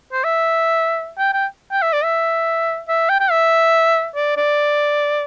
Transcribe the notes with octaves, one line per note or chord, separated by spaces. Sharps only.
C5
E5
G5
G5
G5
E5
D5
E5
E5
G5
G5
E5
D5
D5